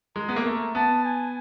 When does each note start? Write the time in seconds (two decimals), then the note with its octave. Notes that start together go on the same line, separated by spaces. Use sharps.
0.16 G#3 A#5
0.29 B3
0.36 A#3
0.46 A3
0.75 B3 A5
1.04 G#5